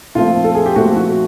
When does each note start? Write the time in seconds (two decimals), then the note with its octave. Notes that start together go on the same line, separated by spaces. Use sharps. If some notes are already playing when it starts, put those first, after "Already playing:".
0.15 A#2 F3 A3 C4 F4
0.44 A4
0.55 G#4
0.66 G4
0.76 A#2 F3 A3 C4 F#4
0.96 F#4